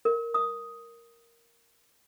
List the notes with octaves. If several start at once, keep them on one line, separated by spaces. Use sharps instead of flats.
A#4
D#6